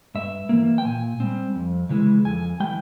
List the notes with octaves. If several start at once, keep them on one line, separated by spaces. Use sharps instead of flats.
G2 E5
E3 A#3
G5
A#2 G#5
G3 C4
F2
C#3 E3 G#3 E4
F2 G#5
E3 G3 G5